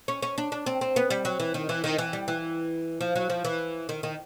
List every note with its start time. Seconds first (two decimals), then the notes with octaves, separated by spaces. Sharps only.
0.08 C#4
0.22 C#4
0.38 D4
0.52 D4
0.66 C4
0.81 C4
0.96 B3
1.10 G3
1.25 F#3
1.40 E3
1.54 D#3
1.69 E3
1.84 D#3
1.98 E3
2.13 G3
2.28 E3
3.01 F3
3.16 F#3
3.30 F3
3.45 E3
3.89 D#3
4.03 D#3